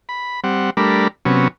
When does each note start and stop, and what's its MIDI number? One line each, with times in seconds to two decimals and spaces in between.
0.09 0.40 83
0.44 0.70 55
0.44 0.70 60
0.44 0.70 78
0.77 1.08 55
0.77 1.08 57
0.77 1.08 62
0.77 1.08 70
0.77 1.08 83
1.25 1.48 48
1.25 1.48 54
1.25 1.48 59
1.25 1.48 61